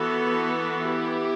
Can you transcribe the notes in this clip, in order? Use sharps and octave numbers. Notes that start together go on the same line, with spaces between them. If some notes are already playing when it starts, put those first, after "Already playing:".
Already playing: E3 B3 F#4 A4
E4 G4